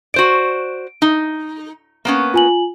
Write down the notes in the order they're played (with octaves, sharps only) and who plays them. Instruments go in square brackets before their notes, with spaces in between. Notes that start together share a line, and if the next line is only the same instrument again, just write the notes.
[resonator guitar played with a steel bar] F#4 C5 D5 [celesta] D7
[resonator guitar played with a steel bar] D#4
A#3 B3 C#4
[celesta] F4 G#5 F#7